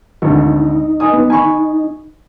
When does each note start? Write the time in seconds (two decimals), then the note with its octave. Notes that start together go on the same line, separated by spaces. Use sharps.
0.22 G#1 D2 D#4
1.00 D#5 G#5 D#6
1.13 B3
1.30 G#5 B5 C#6